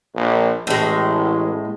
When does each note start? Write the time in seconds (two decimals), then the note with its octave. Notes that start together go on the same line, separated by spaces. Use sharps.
0.15 A#1
0.67 A1 A2 G#3